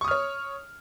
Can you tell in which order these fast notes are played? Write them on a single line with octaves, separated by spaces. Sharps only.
C#6 D#6 F6 C#5